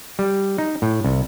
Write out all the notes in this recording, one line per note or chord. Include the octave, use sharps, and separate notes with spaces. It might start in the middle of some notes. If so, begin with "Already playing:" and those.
G3
D#4
A2
C2